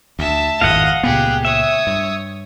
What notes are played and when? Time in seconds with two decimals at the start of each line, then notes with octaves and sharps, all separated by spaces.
0.19 D2 E5 A5
0.61 G#1 F2 A2 D#5 F5 F#5
1.03 C#2 A#2 B3 G4 G#4
1.45 C#5 E5 D#6
1.87 G2